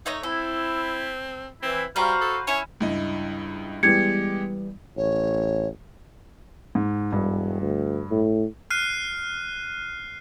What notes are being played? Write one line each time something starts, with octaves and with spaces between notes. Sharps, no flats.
A3 D#4 C#5 A#5
C4 E4 A4
E3 C4 E4
G3 F#4 B4 C5 F5 A#5
A4
C#4 E4 C#5
C#2 G2 E4 D#5
E3 G3 G#3 B3 G4 G#6 C#7
A1 C#5
G#2
E1 G2
D2
A2
F6 F#6 C7 D#7